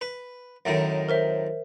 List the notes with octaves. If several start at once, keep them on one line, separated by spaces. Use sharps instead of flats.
B4
F#2 A2 D#3
A#4 C5 E5